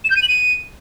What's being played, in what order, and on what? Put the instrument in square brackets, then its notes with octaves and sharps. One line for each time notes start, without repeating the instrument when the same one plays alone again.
[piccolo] E7
G6
D#7
F#7
D#7